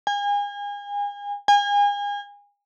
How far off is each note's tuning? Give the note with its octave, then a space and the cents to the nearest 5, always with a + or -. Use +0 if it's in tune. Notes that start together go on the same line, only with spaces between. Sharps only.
G#5 -35
G#5 -35